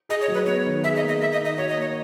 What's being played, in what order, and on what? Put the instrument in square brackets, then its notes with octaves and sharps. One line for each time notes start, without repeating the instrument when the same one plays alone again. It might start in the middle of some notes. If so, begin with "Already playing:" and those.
[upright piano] G#4 [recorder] D#5
[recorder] C#5
[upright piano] F#3
[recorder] B4
[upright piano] B3 [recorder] C#5
[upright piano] D#3
[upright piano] G#4 [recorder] E5
[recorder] D#5
[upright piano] A#3
[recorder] D#5
[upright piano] A#3 [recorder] E5
[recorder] D#5
[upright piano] D#3
[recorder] D#5
[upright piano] F#4 [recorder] C#5
[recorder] D#5
[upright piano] A#3 [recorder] C#5